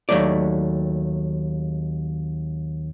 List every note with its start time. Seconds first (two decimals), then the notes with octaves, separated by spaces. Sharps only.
0.09 D#2 F#3 A3 D5